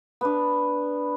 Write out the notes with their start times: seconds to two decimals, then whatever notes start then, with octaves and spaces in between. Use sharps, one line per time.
0.21 B3 D4